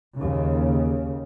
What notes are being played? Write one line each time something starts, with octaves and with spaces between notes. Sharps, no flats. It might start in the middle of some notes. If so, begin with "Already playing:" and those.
D#2 C#3